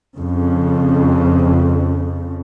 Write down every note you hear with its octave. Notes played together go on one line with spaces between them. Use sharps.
F2 C#3